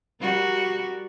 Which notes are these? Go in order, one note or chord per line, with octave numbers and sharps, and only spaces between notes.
G3 F#4 A#4